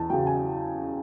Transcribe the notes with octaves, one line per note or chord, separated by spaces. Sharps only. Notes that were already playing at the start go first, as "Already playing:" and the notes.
Already playing: E2 A5
C#3 F#3 G5
G#5